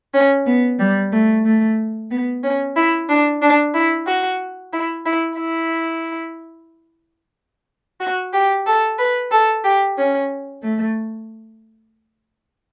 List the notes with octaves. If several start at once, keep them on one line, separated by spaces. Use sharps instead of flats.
C#4
B3
G3
A3
A3
B3
C#4
E4
D4
D4
E4
F#4
E4
E4
E4
F#4
G4
A4
B4
A4
G4
C#4
A3